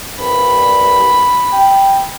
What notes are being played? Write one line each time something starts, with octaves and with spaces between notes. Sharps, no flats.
C2 G2 B5
G5